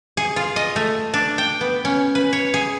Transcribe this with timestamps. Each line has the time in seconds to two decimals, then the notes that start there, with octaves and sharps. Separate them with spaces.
0.17 G#4
0.36 F4
0.56 D#5
0.76 A3
1.14 D4
1.38 G5
1.61 B3
1.85 C#4
2.15 B4
2.33 C#5
2.54 G#4